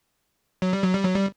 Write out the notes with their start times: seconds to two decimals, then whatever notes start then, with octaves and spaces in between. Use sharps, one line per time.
0.62 F#3
0.73 G3
0.83 F#3
0.94 G3
1.05 F#3
1.16 G3